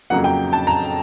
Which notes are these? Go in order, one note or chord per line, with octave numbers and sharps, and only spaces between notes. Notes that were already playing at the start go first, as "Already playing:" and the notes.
F2 C#3 F#3 A#3 F#5
G5
A5
A#5